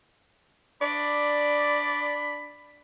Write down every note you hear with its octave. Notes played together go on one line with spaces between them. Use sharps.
D4 D5 B5